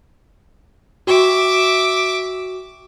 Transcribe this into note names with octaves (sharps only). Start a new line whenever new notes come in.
F#4 E5 G5 C#6 D6